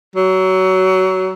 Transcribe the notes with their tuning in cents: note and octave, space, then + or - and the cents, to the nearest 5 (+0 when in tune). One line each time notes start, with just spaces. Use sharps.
F#3 +20